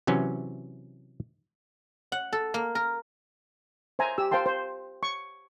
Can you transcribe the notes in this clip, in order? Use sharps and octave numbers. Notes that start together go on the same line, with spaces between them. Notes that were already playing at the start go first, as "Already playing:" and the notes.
C3 E3 F#3 C#4
F#5
A4
A#3
A#4
C5 E5 G#5 A#5
G4 E6
C5 F5 G5 A5 C6
C5
C#6